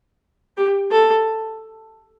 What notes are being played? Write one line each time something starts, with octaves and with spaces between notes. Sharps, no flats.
G4
A4